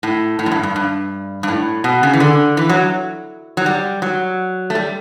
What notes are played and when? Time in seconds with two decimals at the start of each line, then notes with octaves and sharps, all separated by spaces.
0.03 A2
0.39 A2
0.46 F#2
0.52 G2
0.63 G2
0.76 G2
1.43 G2
1.48 A2
1.84 B2
2.03 C#3
2.13 E3
2.20 D3
2.57 E3
2.69 F#3
3.57 F#3
3.66 G3
4.02 F#3
4.70 A3
4.75 G3